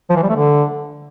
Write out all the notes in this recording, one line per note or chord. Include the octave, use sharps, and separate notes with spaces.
F3
E3
G3
A3
D3